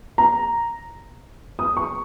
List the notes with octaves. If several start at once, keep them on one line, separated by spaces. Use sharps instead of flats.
A#5
D#6
C#6